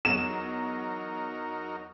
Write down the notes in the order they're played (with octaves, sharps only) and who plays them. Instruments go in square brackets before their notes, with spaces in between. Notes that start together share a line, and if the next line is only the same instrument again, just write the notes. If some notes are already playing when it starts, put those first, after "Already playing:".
[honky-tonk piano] E2 F#3 [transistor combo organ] D#4 F#4 A#4 [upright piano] E7